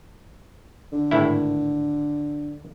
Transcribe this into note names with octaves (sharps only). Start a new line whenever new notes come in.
D3
G#1 A2 E4